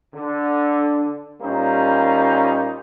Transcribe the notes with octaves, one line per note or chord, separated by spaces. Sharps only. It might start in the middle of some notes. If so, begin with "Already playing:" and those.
D3
A#2 G3 A#3 C#4 D#4 C5